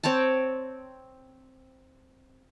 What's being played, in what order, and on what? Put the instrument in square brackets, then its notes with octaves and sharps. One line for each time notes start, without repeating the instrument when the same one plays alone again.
[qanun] C4 C#5 G5 A5